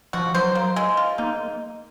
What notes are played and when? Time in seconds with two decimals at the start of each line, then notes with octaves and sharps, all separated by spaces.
0.13 F3 F#4
0.34 F#3 C5
0.55 A#3
0.76 G#3
0.97 F4
1.18 A#3 D#4